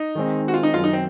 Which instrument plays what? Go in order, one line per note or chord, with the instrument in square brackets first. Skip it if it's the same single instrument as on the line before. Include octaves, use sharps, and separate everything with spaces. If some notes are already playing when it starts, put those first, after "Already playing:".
Already playing: [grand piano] D#4
[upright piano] D#3 G#3 C4
[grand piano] F#4
F4
D#4
[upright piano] F#2 D#3 F#3 [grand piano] F4
[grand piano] D#4
C4